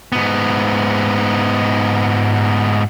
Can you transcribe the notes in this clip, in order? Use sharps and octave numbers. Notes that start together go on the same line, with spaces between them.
G#2 B3